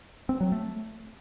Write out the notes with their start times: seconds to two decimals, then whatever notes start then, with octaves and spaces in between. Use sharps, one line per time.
0.29 C4
0.41 F#3
0.52 A3